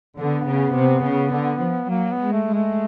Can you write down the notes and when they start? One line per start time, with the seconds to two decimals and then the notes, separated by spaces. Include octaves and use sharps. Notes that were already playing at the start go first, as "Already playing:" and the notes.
0.16 D3 B3
0.45 C#3
0.74 C3
1.03 C#3
1.32 D3
1.60 F3
1.89 F#3 A#3
2.11 B3
2.19 G#3
2.32 A3
2.47 G#3
2.54 A3